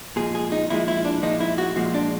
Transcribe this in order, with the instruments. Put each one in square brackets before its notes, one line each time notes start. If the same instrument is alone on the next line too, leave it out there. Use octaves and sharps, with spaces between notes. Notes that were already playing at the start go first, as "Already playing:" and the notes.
[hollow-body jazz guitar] A#2 F3 G#3 G#4
G#4
D#4
A#2 F3 G#3 E4
E4
D4
A#2 F3 G#3 D#4
E4
F#4
A#2 F3 G#3
D4